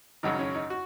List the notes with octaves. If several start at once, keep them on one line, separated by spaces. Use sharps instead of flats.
G#1 F#2 C#3 D#4
C#4
D#4
F#4